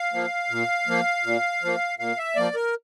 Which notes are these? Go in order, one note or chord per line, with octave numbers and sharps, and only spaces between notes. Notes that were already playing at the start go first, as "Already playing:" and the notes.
Already playing: F5
F3 A#3
A#2
F3 A#3
A#2
F3 A#3
A#2 F5
E5
F3 A#3 D5
A#4